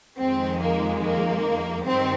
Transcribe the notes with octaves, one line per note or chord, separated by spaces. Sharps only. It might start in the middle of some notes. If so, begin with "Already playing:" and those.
F2 D#3 G#3 C4
A#3
A#3
G2 D#3 C4